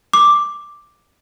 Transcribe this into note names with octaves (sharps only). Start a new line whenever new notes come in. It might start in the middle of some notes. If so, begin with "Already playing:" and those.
D6